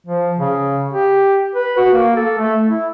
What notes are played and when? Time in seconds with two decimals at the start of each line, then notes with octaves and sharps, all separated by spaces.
0.07 F3
0.39 C#3
0.93 G4
1.55 B4
1.77 F#4
1.93 A#3
2.17 A4
2.39 A3
2.67 E4